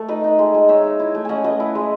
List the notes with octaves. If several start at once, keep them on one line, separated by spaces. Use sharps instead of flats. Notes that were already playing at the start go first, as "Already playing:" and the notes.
Already playing: A3 A4
D#4 B4 D#5
D#4
G#3
G#3
D#4 C#5 E5
D#4
E4
A3
C#4 D#5 F#5 G#5
A3 B4 D#5
E4
G#3